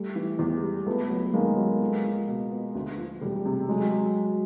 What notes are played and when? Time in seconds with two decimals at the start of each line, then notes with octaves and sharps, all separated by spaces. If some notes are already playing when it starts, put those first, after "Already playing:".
Already playing: G3 A3
0.16 E3
0.39 E2
0.62 G3
0.86 C#2 A3 B3
1.10 F#3
1.33 D#2 G#3 A#3
1.57 F#3
1.81 C#2
2.04 F3
2.28 B2
2.51 B3
2.75 D2
2.98 F3
3.21 E1 G3 A3
3.45 C3
3.69 F#3 G#3